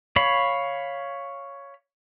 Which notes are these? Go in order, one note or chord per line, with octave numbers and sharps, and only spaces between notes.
C#5 F5 B5